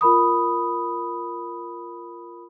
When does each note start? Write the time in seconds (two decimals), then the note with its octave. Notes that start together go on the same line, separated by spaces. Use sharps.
0.01 F4 A#4 B5 D#6